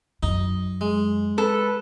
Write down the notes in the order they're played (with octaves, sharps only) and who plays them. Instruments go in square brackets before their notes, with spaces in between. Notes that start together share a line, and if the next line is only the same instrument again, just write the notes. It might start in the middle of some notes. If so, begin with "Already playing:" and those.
[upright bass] F#2 [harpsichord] D#4
[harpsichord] G#3
[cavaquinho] A4 [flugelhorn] B4